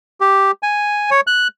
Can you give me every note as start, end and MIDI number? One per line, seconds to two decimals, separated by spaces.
0.20 0.51 67
0.63 1.10 80
1.11 1.21 73
1.27 1.48 90